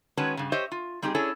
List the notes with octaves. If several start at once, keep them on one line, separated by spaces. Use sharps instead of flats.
D#3 G#3 C#4 F#4 B4 A5
G2 C#3
G4 C5 C#5 D#5 E5
F4
G3 C4 D#4 G4 G#4
C#4 D4 E4 G#4 A4 C#5